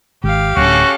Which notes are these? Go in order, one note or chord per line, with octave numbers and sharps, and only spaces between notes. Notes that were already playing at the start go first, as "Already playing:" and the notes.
G#1 G4 F5
D1 C#4 F#4 A4